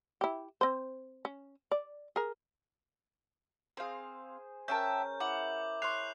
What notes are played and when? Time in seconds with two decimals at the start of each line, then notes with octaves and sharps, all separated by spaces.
0.21 E4 G4
0.61 C4 C5
1.25 C#4
1.71 D5
2.16 G#4 A#4
3.77 C4 G#4 C5 F5
4.68 C#4 A#4 E5 G5 A5 G6
5.20 E4 F#5 D6 F#7
5.82 C#5 C6 D6 F6 F#6 C7 F7